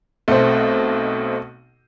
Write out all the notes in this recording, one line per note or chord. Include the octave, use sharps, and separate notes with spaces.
B1 B2 A3 C4 C5